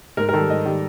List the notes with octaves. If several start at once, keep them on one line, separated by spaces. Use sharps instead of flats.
G#2 A#4
A#4
D#3 G3 A4
G#2 D#5
D#3 G3